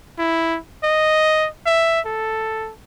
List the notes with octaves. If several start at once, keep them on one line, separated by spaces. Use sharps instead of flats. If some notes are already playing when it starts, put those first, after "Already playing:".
E4
D#5
E5
A4